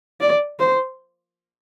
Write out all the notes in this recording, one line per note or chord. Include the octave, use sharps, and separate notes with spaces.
D5
C5